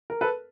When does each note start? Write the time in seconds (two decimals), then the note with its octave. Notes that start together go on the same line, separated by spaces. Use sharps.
0.10 A#4
0.21 A4 B4